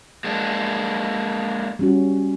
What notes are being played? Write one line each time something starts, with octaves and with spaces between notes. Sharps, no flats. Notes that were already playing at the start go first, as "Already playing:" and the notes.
G#3 A#3 D4
G3 C#4 F#4